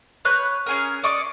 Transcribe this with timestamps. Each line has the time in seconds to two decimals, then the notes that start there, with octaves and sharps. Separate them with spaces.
0.25 B4 C#5 F#6 G6
0.66 C#4 G#4 A#4
1.04 D5 D#5 C#6 D6